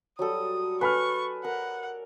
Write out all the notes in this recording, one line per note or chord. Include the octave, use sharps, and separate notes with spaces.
F#3 G3 A4 D#6
A4 B4 D5 G#5 B5 C#6 F6
A#4 F#5